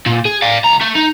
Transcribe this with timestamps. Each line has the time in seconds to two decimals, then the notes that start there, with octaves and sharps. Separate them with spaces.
0.06 A#2
0.25 G#4
0.42 D5 F5
0.64 C#2 A#5
0.81 A3
0.95 D#4